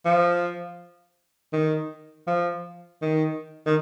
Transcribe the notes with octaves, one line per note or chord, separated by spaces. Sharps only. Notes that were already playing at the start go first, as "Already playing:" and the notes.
F3
D#3
F3
D#3
D#3